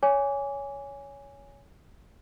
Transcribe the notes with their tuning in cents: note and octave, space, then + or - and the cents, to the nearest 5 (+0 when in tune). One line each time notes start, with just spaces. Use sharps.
C#5 +15 G#5 -5 D6 -30